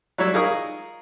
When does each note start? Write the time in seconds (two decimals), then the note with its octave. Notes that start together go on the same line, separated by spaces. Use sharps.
0.18 F#3 G3 E4 C#5 E5
0.34 D#4 F4 G#4 A#4 C#6 D#6